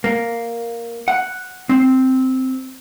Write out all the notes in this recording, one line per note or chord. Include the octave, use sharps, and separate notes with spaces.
A#3
F#5
C4